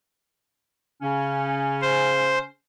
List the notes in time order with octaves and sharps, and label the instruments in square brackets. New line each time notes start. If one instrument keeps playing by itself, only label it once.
[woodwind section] C#3 C#4
[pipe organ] C5